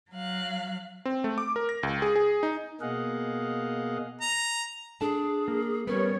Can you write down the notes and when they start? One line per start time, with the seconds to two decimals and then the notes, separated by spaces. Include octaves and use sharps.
0.12 F#3 F5 F#6
1.05 C4
1.24 A3
1.38 D6
1.56 A#4
1.69 A#6
1.83 C#2
2.02 G#4
2.16 G#4
2.43 D#4
2.81 B2 A#3 G#4 D#5 F5 F#5
4.21 A#5
5.01 D4 G#4 A4 A5
5.48 A#3
5.87 G3 B3 C#4 A#4 B4 C#5